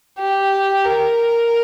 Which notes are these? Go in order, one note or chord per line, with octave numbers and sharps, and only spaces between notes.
G4
A#4